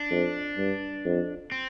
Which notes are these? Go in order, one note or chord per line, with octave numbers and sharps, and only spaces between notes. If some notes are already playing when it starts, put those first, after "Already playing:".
Already playing: D4
F2
G2
F2
C4